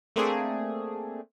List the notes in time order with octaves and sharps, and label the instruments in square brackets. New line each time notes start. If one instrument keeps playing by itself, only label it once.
[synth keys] A3 A#3 C4 D4 G#4